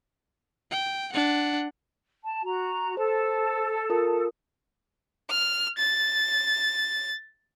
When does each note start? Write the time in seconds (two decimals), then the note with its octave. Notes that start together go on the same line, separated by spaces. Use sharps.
0.71 G5
1.13 D4 F#5
2.23 A5
2.44 F#4 A#5
2.97 A4 C5 A5
3.90 F4 A#4 D#6
5.30 F6
5.78 A6